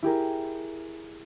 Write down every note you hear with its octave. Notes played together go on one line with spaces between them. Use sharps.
E4 G4 G#4 A#4